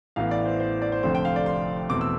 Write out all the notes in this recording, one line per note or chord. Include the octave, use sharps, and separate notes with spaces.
A1 A2 E3 B3 F5
D5
C5
C5
D5
C5
F1 F2 D3 A3 C4 C5
G5
F5
D5
C6
E2 B2 A3 C4 D6
E6